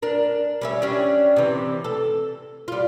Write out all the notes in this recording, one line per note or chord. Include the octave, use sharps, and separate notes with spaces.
D4 A#4
G3 C#4 E5
C#4 D4 G4
C3 E3
A4
G3 F4